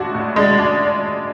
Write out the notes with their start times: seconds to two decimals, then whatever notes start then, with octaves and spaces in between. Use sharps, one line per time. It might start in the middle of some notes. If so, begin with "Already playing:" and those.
Already playing: A2 G#3 D4 F#4
0.15 A2
0.36 G#3 D5
0.58 D4